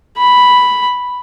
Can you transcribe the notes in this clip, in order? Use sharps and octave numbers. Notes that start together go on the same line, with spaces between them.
B5